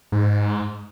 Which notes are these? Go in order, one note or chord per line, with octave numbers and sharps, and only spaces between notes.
G#2